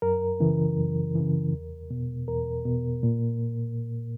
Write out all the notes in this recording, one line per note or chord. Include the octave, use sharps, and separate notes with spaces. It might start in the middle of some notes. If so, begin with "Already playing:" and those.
F#2 A#4
C#3 E3
F#2
C#3 E3
E2
B2
E2 A#4
B2
A#2